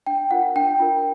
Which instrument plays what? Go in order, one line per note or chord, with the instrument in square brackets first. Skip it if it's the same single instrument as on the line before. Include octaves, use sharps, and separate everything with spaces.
[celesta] D4 G5
F4 A#4 F#5
D4 G5
F4 A#4